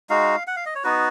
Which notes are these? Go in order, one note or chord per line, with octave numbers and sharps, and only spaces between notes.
G#3 D#4 F#4 F5
F#5
F5
D#5
C#5
B3 D#4 F#4 B4